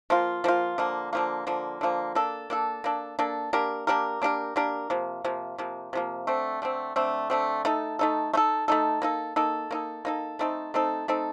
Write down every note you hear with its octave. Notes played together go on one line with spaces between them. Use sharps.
F3 A#3 F4
F3 A#3 F4
D3 F3 A#3
D3 F3 A#3
D3 F3 A#3
D3 F3 A#3
A#3 D4 A4
A#3 D4 A4
A#3 D4 A4
A#3 D4 A4
A#3 D4 G4 A#4
A#3 D4 G4 A#4
A#3 D4 G4 A#4
A#3 D4 G4 A#4
C3 F3 A#3
C3 F3 A#3
C3 F3 A#3
C3 F3 A#3
D3 A3 C4
D3 A3 C4
D3 A3 C4
D3 A3 C4
A3 D#4 A4
A3 D#4 A4
A3 D#4 A4
A3 D#4 A4
A#3 D#4 A4
A#3 D#4 A4
A#3 D#4 A4
A#3 D#4 A4
A3 C4 D#4 A4
A3 C4 D#4 A4
A3 C4 D#4 A4